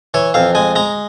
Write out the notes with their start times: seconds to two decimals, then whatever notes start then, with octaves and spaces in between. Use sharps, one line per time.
0.14 E3 C#5
0.34 F2 F5
0.55 G#3 G#5
0.76 G#3 A#5